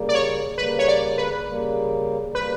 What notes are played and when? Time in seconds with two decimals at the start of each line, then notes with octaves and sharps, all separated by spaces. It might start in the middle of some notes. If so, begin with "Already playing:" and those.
Already playing: C#3 G3 A#3
0.09 D5
0.15 C#5
0.58 C#3 G3 A#3 B4
0.79 C#5
0.88 D5
1.18 B4
1.47 C#3 G3 A#3
2.35 C#3 G3 A#3 B4